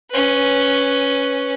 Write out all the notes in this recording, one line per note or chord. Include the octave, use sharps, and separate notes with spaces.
C#4 B4